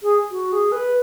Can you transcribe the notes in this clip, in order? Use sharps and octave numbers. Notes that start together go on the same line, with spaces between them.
G#4
F#4
G#4
B4